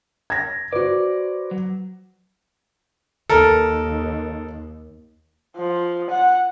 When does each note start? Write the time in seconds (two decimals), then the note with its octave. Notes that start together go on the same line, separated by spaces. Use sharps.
0.30 G#6 A#6
0.72 F#4 B4 C5 D5
1.51 F#3
3.29 D#2 A4 A#4
5.57 F3
6.10 F#5